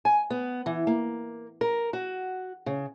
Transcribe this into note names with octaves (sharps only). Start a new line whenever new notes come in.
G#5
B3
E3
A#3
A#4
F#4
C#3